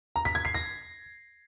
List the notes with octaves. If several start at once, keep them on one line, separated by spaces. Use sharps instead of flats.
A#5
B6
G#6
C7
A#6